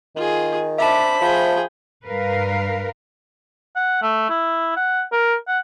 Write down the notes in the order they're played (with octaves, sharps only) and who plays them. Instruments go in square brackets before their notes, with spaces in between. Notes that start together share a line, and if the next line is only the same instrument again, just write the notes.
[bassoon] D#3 [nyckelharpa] F4 G#4
[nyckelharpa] D4 D6 [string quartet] C5 B5 [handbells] E5 A5
[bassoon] F3 [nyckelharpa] G#4 G5
[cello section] G2 A#4 B4 F5
[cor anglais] F#5
A3
E4
F#5
A#4
F#5